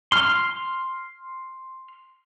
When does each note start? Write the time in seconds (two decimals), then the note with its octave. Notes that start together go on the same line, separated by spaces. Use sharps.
0.12 C6 F6